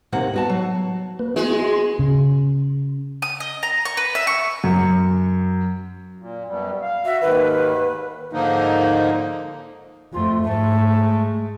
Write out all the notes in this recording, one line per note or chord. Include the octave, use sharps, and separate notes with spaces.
D#2 C3 A#3 F#5
B3 F#4 A5
F#3
A#3 B4
G#3 B3 E4 F#4
F#4 C6
C#3
D#6
D#5
A#5
C#6
B4
E5
C#6
F#2
A#2
F#2 B2 G3
F5
F#4 E5
D#2 G#2 D#3 B4
G#2 D3 F3 A#3 D#4
F2 A3 F4
G#2 A3
G#3